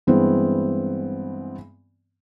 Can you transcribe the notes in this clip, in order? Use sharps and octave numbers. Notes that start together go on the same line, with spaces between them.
G2 E3 G#3 B3 C4